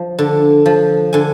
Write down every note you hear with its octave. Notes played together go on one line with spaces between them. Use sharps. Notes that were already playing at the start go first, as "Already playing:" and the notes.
Already playing: F3
D3
F3
D3 G#5